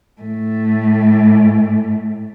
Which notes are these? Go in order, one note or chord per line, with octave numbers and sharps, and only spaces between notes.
A2 A3